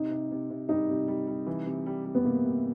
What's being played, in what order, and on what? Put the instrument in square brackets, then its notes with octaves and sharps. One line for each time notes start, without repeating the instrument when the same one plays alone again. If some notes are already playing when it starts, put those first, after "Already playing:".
Already playing: [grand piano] C3 [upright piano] D#4
[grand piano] C3
C3
C3
[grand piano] G3 [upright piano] D#4
[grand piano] C3
G3
G3
E3
C3
G3
G3
[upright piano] B3
[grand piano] C3 [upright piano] A#3
[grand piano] C3